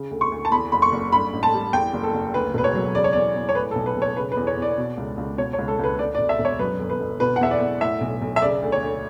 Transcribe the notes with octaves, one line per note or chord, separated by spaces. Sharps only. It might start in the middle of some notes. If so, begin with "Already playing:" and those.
Already playing: C#3
D2
C#6
D2
A5
E2 B5
F#1 B5
C#6
F#1
G2 B5
A1
A5
G3
E2 G5
F#1
A4
F#1
D2 B4
E1 B4
C#5
F#3
C#3 D5
C#5
E2 D5
E2
C#5
A2 B4
A4
B1
B4
B1
C#5
C#3 B4
B4
E2
C#5
E2
D5
B2
C#2
C#2
B2 C#5
C#5
C#2
A4
C#2 B4
D2 D5
D5
E1
E5
E1
C#5
F#2 B4
G1
B4
G1
B2 B4
F#5
E2 E5
D5
E2
A2 E5
B1
B1
E5
C#3 D5
D2
C#5
D2